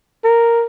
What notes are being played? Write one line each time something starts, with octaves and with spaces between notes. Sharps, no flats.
A#4